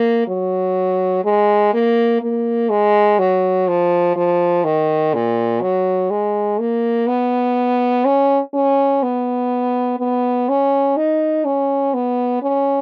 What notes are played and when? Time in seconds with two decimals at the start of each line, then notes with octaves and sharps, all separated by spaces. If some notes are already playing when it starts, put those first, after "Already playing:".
Already playing: A#3
0.27 F#3
1.25 G#3
1.73 A#3
2.22 A#3
2.70 G#3
3.19 F#3
3.68 F3
4.16 F3
4.64 D#3
5.14 A#2
5.62 F#3
6.10 G#3
6.59 A#3
7.07 B3
8.05 C#4
8.53 C#4
9.02 B3
9.99 B3
10.49 C#4
10.97 D#4
11.45 C#4
11.94 B3
12.42 C#4